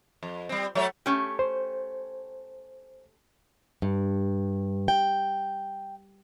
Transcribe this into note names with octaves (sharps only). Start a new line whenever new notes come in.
F2
G3 C4
F#3 A3 C#5
A3 C#4 G4
C5
G2
G5